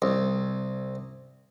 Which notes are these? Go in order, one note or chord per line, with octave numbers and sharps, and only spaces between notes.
C2